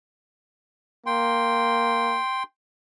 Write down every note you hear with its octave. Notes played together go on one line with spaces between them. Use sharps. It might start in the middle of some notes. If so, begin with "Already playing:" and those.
A#3 G5 C6